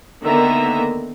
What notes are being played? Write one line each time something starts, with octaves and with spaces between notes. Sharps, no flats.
D3 D#3 A#3 B3 E5 A#5